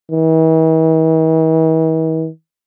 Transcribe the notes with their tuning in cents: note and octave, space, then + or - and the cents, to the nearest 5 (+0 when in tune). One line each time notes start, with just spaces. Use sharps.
E3 -45